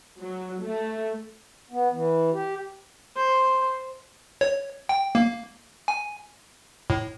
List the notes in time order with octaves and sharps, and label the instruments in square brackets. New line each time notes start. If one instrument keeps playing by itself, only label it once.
[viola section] F#3
A3
[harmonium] B3
E3
G4
[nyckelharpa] C5
[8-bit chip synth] C#5
G5
A#3
G#5
A2